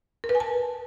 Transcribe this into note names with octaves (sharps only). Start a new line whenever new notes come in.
A#4
B4
G#5
A5